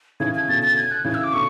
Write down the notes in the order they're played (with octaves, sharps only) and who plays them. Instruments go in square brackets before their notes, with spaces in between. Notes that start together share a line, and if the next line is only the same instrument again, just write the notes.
[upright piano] C#3 E3 [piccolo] G#6
[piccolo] G#6
[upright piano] B2 D3 [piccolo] A6
[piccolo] A6
G#6
F#6
[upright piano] C#3 E3 [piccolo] G#6
[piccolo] E6
D6
[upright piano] B2 D3 [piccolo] C#6